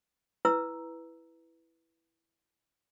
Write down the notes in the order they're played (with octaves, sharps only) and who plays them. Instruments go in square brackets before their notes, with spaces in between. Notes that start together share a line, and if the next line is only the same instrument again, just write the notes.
[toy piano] E4 B4 A#5 E6